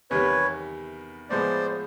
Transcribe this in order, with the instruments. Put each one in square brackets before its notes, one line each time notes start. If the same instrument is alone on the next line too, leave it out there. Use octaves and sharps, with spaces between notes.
[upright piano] E2 C3 D#3 G3 B3 [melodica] B4 C#5
[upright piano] A2 F3 G#3 B3 [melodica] C5 D5